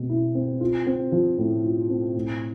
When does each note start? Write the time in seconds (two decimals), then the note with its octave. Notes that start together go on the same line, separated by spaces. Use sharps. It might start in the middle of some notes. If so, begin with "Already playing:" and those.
Already playing: B2 A3 C4
0.09 E4
0.35 C4
0.61 F4
0.87 C4
1.12 F3
1.38 A2
1.64 F4
1.90 C4
2.15 A2